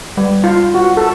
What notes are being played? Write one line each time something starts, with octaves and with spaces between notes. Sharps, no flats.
G3
F4
F#4
A4